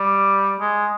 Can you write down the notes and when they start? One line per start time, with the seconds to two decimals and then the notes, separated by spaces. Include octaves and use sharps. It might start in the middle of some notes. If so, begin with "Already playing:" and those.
Already playing: G3
0.60 G#3